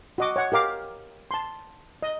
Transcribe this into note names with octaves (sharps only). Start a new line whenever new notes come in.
F#4 D#5 D6
C#5 F#5
G4 A#4 F5 D6
A5 C6
D#5